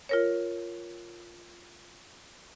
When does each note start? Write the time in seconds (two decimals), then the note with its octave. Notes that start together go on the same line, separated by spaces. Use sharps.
0.09 F4 A#4 C#5